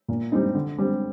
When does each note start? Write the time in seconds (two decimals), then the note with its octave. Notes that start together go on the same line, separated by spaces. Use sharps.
0.08 A#2
0.32 G3 C4 D#4
0.55 D3
0.78 G3 C4